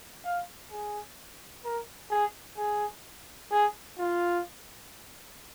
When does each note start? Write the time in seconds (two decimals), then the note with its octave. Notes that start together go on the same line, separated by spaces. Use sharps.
0.24 F5
0.72 G#4
1.64 A#4
2.11 G#4
2.58 G#4
3.52 G#4
3.98 F4